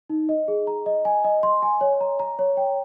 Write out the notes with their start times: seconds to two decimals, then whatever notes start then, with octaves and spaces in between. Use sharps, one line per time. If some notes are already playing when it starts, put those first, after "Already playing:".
0.10 D#4
0.29 D#5
0.48 G#4
0.67 A#5
0.86 D#5
1.05 G#5
1.24 D#5
1.43 C6
1.62 G#5
1.81 C#5
2.01 A#5
2.19 A#5
2.39 C#5
2.57 G5